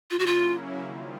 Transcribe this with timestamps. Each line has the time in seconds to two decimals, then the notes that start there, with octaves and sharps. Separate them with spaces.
0.11 C#3 F#3 A#3 C#4 E4 F4
0.19 F#4
0.26 F4
0.80 D#3 G3 C4 F4